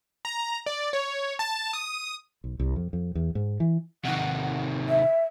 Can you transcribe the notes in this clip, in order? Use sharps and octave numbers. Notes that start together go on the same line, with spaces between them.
A#5
D5
C#5
A5
D#6
B1
C2
F2
F2
E2
G#2
E3
C3 D#3 F#5
E5